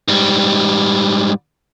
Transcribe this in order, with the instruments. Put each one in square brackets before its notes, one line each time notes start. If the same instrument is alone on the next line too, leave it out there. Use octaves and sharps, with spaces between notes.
[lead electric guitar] G#2 G3